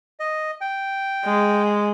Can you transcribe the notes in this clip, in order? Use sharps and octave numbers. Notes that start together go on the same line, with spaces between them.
D#5
G5
G#3